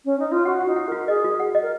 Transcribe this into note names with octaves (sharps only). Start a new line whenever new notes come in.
C#4
D#4
F4
F#4 F#5
F#5
D#4
F#5
F#4 A#4
G#4 D#5
F#4
F#5
D#5
A#4